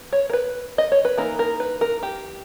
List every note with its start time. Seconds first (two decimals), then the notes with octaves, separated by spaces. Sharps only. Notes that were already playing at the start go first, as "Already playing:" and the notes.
Already playing: B3
0.13 C#5
0.30 A#4
0.33 B4
0.78 D#5
0.92 C#5
1.05 B4
1.18 E3 A#3 D#4 A#4
1.39 A#4
1.60 B4
1.81 A#4
2.03 G4